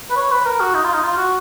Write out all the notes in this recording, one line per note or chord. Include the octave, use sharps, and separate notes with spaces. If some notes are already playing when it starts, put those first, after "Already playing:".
B4
C#5
B4
A#4
F#4
D#4
F4
D#4
F4
F#4